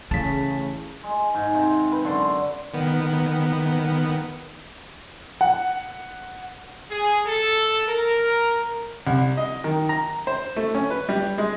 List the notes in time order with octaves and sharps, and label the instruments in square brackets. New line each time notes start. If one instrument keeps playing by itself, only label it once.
[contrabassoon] A1 [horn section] C#3 [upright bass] A3 [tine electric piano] A5 B6
[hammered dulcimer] G#3
G#2
C3
B4
F#2 D3 C6
[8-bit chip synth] D#3 B3
[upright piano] F#5
[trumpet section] G#4
A4
A#4
[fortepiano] C2
D#5
D#3
A#5
C5
A3
C#4
B4
G3
G#3